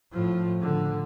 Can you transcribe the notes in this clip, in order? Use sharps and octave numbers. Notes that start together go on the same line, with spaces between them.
A2 F3
D3